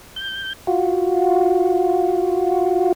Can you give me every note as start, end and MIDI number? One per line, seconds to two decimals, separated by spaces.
0.16 0.53 91
0.67 2.92 65
0.67 2.92 66